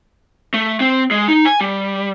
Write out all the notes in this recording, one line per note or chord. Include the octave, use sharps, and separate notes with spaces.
A3
C4
G#3
D#4
G#5
G3